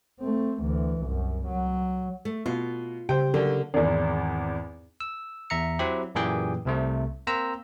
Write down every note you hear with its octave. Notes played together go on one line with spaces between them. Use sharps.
A3 C4
D2 E3
C2 F#2
F#3
A3
B2 F4
C#3 G4 C5 G5
D3 F#3 A#3
G#1 E2
E6
E2 E5 A#5 C#7
F#3 C4 E4 G4
F#2 A#2 E3 G4 G#4 G5
C2 C3 A3
A#3 C4 C5 A#5 E6